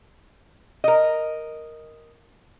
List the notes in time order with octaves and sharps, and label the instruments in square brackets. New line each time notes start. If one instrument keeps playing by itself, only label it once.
[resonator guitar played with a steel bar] A#4 D#5